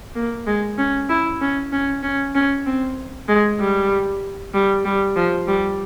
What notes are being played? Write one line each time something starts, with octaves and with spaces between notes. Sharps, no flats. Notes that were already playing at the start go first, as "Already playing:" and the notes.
A#3
G#3
C#4
E4
C#4
C#4
C#4
C#4
C4
G#3
G3
G3
G3
F3
G3